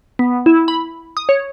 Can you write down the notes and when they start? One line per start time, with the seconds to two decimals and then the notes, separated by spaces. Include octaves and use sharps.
0.19 B3
0.46 E4
0.68 B5
1.17 D#6
1.29 C#5